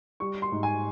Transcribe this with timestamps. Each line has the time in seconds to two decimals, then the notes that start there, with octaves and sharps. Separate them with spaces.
0.20 G3 C#6
0.42 C6
0.52 G#2
0.63 G#5